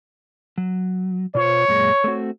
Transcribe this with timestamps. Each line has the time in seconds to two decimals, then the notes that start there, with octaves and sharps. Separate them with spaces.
0.58 F#3
1.35 B2 F4 C5 C#5
1.68 F#2 A#2 G#3
2.04 A3 C4 F#4